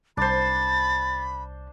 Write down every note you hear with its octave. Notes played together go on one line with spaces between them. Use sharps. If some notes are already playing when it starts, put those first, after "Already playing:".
C2 D4 C5 B5 A6